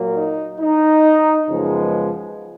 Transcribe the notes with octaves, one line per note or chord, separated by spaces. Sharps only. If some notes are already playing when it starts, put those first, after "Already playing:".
Already playing: A#2 F#3 A#3
D#4
D#4
F#2 C#3 F3 G#3 B3